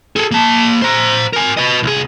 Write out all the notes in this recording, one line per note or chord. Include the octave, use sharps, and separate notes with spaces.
G#4 A4
A#3 A5
C5 A#5
A#4 G#5
B4 D#5
C2 G#4